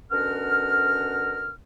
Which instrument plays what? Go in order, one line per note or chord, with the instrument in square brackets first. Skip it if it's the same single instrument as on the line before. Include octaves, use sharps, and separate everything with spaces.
[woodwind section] B2 D3 C#4 A#4 F#5 F6